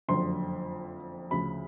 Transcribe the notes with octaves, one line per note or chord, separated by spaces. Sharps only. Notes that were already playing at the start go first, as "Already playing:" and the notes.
F#1 F2 D3 F#3 C6
D2 C#3 F3 B5